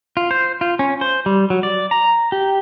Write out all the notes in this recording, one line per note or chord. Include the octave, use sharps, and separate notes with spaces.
F4
C5
F4
C#4
C5
G3
F#3
D5
A#5
G4